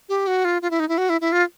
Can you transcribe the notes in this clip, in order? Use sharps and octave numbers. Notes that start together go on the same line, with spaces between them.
G4
F#4
F4
F4
E4
D#4
E4
F#4
E4
E4
F4